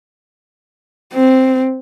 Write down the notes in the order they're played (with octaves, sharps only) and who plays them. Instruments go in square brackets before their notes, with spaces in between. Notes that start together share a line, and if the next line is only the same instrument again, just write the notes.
[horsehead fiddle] C4